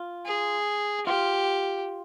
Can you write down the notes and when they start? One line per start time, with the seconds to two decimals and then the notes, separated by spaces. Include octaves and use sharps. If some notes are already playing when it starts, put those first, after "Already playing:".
Already playing: F4
0.26 G#4
1.06 F4 G4